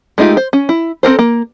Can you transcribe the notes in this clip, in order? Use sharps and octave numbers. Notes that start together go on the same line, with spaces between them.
G#3 A3 D#4 F4 G4
C5
C#4
E4
C4 A4 A#4 C5
A#3